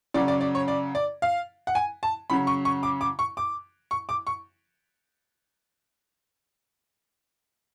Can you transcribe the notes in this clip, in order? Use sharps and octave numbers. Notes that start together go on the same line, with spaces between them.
C#3 F#3 C#4 D5
D5
D5
C#5
D5
D5
F5
F#5
G#5
A5
C#3 F#3 C#4 B5
C#6
C#6
D6
D6
C#6
D6
C#6
D6
C#6